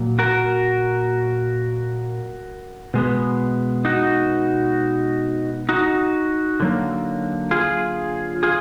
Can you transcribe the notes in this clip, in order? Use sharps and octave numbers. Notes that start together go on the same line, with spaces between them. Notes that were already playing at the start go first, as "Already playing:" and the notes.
Already playing: A#2 F#3 A#3
F#4 A#4
B2 G#3 B3
D#4 F#4
D#4 F#4
D3 F#3 A#3
F4 G#4
F4 G#4